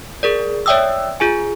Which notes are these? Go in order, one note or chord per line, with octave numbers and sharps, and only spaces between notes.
G#4 A#4 D5
C#5 D5 E5 G5 D#6 E6
F4 G#4 G#5